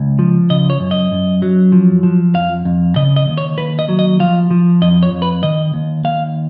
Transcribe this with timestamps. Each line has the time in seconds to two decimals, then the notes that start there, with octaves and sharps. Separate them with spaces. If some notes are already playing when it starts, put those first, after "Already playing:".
Already playing: C#2
0.19 F3
0.50 C#3 D#5
0.70 C#5
0.80 F#2
0.91 D#5
1.12 F#2
1.42 F#3
1.72 F3
2.03 F3
2.34 F2 F5
2.65 F2
2.96 C#3 D#5
3.16 D#5
3.28 D#2
3.38 C#5
3.58 D#2 B4
3.79 D#5
3.89 F#3
3.99 D#5
4.20 F3 F5
4.51 F3
4.82 F2 D#5
5.03 C#5
5.12 F2
5.22 B4
5.43 D#3 D#5
5.74 D#2
6.05 D#2 F5